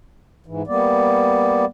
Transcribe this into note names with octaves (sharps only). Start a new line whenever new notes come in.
G#2 E3
G3 A#3 B3 D5